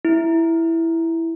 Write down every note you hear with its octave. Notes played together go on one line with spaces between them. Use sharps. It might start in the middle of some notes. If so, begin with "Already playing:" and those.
E4